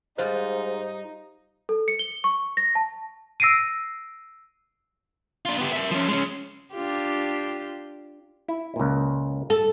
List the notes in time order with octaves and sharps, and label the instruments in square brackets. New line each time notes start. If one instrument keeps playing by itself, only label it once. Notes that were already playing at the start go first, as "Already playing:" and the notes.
[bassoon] G#2 [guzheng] G3 F4 [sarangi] D#4 [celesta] C5
[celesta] A4
C#7
G7
C#6
A#6
A5
E6 A#6 C7 D7 D#7
[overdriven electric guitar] D4 F4
B3 G4
A#4 E5
F3 C#4
G#3 C#4
[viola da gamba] D4 F4 G4
[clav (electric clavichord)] E4
C#2 A#2
[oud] A4